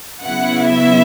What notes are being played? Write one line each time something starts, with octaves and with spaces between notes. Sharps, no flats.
C#3 F#3 B3 E4 F#5
E5